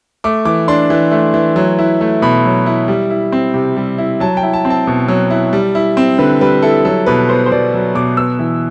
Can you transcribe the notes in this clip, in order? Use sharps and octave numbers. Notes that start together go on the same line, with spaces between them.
A3 D6
E3 D6
D4 C6
E3
A3
E3
F#3
E4
A3
B2 B5
F#3
E4
G3
E4
C4
C3
G3
E4
F#3 A5
G5
E4
A5
C4
A5
B2
F#3
E4
G3
E4
C4
D3 B4
G3 B4
E4 A4
F#3 A4
B2 B4
B3 C5
C5
B2 D5
F#3
B2 D6
B3 E6
E3